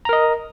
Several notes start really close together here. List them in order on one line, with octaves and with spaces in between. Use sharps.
A#5 A#4 D#5